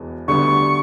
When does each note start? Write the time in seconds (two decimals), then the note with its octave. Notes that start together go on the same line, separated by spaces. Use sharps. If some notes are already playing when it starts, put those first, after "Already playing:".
Already playing: E1 E2 B2
0.28 D2 D3 G3 B3 C#6